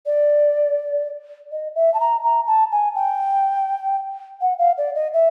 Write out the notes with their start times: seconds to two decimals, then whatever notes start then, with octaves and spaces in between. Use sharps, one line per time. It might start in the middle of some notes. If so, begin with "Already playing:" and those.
0.06 D5
1.52 D#5
1.75 E5
1.94 A5
2.00 A#5
2.23 A#5
2.47 A5
2.72 G#5
2.95 G5
4.41 F#5
4.58 F5
4.78 D5
4.95 D#5
5.13 E5